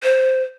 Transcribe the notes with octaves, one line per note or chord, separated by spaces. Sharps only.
C5